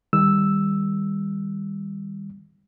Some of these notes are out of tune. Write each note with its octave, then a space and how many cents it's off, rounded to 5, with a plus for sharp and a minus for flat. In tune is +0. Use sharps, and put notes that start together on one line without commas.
D#3 +10 G3 +20 E6 +0